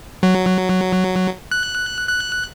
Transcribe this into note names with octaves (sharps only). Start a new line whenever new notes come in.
F#3
F#6
F#6